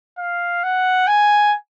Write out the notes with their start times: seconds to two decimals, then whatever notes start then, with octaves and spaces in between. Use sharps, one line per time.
0.18 F5
0.63 F#5
1.07 G#5